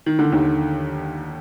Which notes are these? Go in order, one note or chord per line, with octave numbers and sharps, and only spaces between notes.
D#3
D3
D#2 D#3